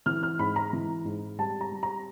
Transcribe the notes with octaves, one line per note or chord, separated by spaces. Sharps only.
E3 F6
F6
G#2 B5
A#5
E3
G#2
G3 A5
A#5
G3
A#5